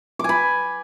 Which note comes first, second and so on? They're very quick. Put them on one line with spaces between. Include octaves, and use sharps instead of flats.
D6 G#5 B5